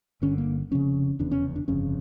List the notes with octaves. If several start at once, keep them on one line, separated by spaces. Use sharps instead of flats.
G1 G2 D3 C#4
A#3
F1 F2 C#3 C#4
F1 E2 C#3 D4
C#4
D4
G1 F2 C#3 C#4